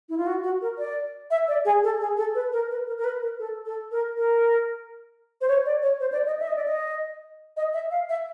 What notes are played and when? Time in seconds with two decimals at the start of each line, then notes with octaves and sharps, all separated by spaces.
0.09 E4
0.17 F4
0.26 F#4
0.43 F#4
0.62 A#4
0.78 D5
1.31 E5
1.48 D5
1.65 G#4
1.83 A4
2.00 G#4
2.17 A4
2.35 B4
2.52 A#4
2.70 B4
2.87 A#4
2.98 A#4
3.04 B4
3.22 A#4
3.39 A4
3.65 A4
3.92 A#4
4.17 A#4
5.41 C5
5.48 C#5
5.65 D5
5.82 C#5
6.00 C5
6.12 D5
6.26 D#5
6.40 E5
6.48 D#5
6.56 D5
6.65 D#5
7.57 D#5
7.73 E5
7.91 F5
8.09 E5